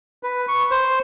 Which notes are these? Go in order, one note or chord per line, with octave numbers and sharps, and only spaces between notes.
B4
C#6
C5